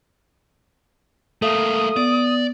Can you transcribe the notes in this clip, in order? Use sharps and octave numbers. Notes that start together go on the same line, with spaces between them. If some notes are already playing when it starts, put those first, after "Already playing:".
A3 A#3 A4 E5 F5 D#6
B3 D5